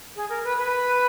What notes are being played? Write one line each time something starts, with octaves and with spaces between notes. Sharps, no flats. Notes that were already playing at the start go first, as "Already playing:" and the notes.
G#4
A#4
B4
B4